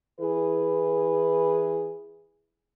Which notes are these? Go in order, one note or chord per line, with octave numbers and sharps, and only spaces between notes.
E3 E4 G#4 B4